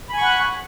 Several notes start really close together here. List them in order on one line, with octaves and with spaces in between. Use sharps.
B5 G#5 C#6 F#5 F#6